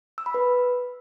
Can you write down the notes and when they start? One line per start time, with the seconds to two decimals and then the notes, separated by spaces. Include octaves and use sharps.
0.18 E6
0.26 B5
0.34 B4